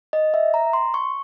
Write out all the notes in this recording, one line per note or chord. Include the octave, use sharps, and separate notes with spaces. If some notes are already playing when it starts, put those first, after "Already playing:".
D#5
E5
A#5
C6
C#6